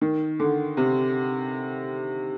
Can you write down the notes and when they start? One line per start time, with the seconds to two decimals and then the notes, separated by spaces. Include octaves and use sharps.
0.01 D#3
0.40 D3
0.77 C3